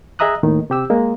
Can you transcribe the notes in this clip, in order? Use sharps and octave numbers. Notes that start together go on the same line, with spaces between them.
G#4 D#5 E5 A#5 D#6 F#6
D#2 A2 D#3
C3 G4 E6
G#3 A#3